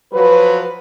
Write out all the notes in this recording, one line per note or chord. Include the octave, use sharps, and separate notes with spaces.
F3 F#3 B4